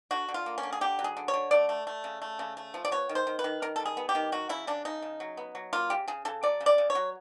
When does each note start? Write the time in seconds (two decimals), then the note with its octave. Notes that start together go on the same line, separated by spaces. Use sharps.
0.11 D3 F#4
0.29 D3
0.34 F4
0.46 A#3
0.58 C#4
0.63 D3
0.73 G#4
0.81 D3 G4
0.99 F#3
1.04 G#4
1.17 D3
1.28 C#5
1.34 D3
1.51 A3 D5
1.69 A3
1.87 A3
2.04 C#3
2.22 A3
2.39 C#3
2.57 A3
2.74 F3
2.85 D5
2.91 B3 C#5
3.09 D#3
3.15 C5
3.27 D#3
3.39 B4
3.44 D#3
3.62 D#3 A#4
3.76 G3 A4
3.86 G#4
3.97 B3
4.09 G4
4.15 D#3
4.32 F#3 F#4
4.49 C#3 E4
4.67 C#3 D4
4.85 C#3 D#4
5.02 C#3
5.20 F#3
5.37 B3
5.55 F#3
5.73 A#3 F4
5.90 C#3 G4
6.08 C#3 G#4
6.25 C#3 A4
6.43 F#3 D5
6.60 C#3
6.66 D5
6.78 C#3
6.90 C#5
6.95 F#3